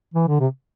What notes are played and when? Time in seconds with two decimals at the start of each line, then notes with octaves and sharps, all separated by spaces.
0.14 E3
0.27 D3
0.40 C3